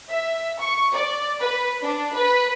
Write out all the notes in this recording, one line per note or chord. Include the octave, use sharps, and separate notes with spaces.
E5
C#6
D5
B4
D4
B4